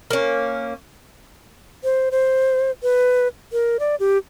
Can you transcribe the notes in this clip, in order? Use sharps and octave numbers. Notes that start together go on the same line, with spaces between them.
A#3 C#4
C5
C5
B4
A#4
D5
G4